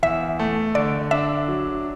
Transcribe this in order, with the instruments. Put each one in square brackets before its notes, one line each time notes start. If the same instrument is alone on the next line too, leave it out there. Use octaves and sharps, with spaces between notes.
[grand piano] E2 [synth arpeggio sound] E5
[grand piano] A3
[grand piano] D3 [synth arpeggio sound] D5
[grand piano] D4 [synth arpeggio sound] E5
[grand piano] F#3